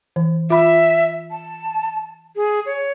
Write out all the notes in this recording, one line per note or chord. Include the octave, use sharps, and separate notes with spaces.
E3
F4 E5 B5
A5
G#4
C#5